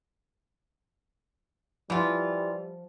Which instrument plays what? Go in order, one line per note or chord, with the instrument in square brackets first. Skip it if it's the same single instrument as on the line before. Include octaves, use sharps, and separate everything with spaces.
[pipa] E3 F4 [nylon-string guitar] F3 F#5 [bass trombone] G3